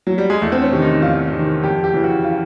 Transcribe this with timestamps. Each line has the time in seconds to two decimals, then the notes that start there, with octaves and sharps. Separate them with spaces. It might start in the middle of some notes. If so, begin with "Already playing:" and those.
0.07 F#3
0.18 G3
0.30 G#3
0.42 E2 A3
0.52 C4
0.62 C#4
0.72 C3 D#3
0.82 D#4
1.02 E2 F4
1.33 C3 D#3
1.63 F2 G4
1.84 G4
1.93 C#3 E3
2.04 F#4
2.24 F4